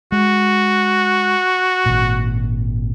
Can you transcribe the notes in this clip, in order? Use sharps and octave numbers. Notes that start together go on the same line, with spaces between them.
G#3 F#4
G#1 A#2